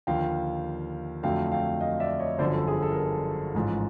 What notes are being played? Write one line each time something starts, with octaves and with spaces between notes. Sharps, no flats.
D#2 D3 F3 F5 G5
F2 D3 F#3 A3 F5 G5
F5 G5
D#5 F5
D5 E5
C#5 D#5
G1 F#2 D3 F3 C5 D5
A4
G#4
A4
A#4
A4
A1 G#2 F3